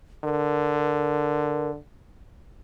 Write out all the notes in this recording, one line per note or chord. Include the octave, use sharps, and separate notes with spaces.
D3 A#4